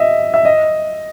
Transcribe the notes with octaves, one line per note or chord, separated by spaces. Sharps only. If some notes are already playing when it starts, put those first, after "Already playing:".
Already playing: D#5 E5
E5
D#5